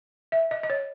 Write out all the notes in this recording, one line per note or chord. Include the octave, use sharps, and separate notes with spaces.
E5
D#5
D#5
C#5